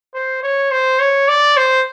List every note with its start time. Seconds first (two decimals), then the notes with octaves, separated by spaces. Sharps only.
0.14 C5
0.43 C#5
0.71 C5
1.00 C#5
1.28 D5
1.57 C5